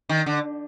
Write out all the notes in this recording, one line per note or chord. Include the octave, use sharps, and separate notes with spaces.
D#3
D3